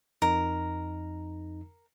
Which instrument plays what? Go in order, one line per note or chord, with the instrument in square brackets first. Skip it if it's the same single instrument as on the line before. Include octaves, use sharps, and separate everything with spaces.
[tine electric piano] F2 D#4 [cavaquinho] A#4